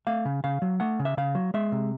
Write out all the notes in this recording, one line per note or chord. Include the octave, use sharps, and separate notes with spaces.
A3 F5
C#3
C#3 F5
F#3
A3 F#5
C#3
E5
C#3 F5
F#3
G#3 E5
C3